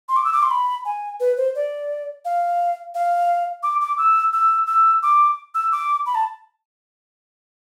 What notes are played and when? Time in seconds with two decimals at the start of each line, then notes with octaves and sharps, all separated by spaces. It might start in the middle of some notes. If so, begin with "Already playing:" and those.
0.09 C6
0.17 D6
0.25 E6
0.33 D6
0.43 C6
0.51 B5
0.85 G#5
1.20 B4
1.37 C5
1.55 D5
2.25 F5
2.95 F5
3.63 D6
3.81 D6
3.98 E6
4.33 E6
4.67 E6
5.03 D6
5.55 E6
5.72 D6
6.06 B5
6.15 A5